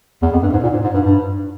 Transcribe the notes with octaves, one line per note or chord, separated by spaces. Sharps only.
E2
F2
G2
G#2
A#2
G#2
G#2
G2
G2